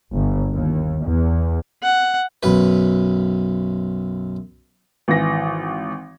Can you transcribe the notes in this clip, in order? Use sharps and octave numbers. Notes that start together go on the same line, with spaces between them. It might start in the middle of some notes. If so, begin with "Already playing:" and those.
G1
D#2
E2
F#5
B1 F#2 B4
G#1 E3 A#6